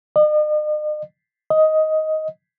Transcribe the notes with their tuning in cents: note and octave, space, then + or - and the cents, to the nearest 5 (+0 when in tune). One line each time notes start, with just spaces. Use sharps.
D#5 -45
D#5 +10